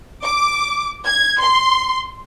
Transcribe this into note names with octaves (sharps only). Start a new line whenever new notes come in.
D6
G#6
C6